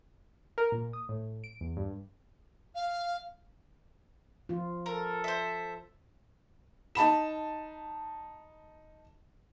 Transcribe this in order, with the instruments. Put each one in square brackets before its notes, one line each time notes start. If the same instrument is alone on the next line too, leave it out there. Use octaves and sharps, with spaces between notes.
[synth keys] A#4
A#2
D#6
A2
D7
E2
G2
[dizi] F5
[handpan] F3 F4
[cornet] A4 [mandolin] A#4
[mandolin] C5 E5
[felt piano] D#4 A5 B5 E7